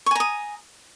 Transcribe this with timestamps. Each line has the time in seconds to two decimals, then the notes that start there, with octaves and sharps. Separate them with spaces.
0.06 C#6
0.11 G#5
0.15 A#5
0.20 D#6